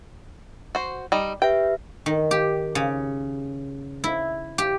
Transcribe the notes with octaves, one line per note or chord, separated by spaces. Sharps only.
F#4 C5
G3 D#4
G4 B4 E5 G5
D#3
G4
C#3
E4
G4